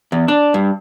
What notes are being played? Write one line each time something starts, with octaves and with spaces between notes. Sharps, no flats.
E2
D4
G2